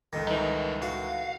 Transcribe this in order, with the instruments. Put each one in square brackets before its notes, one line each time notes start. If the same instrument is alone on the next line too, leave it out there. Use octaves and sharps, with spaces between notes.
[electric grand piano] C#2 A4 A#6 [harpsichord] D#3
[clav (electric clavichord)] E3 D#4 [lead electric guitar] G3 A#4
[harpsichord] F#4 [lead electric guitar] F5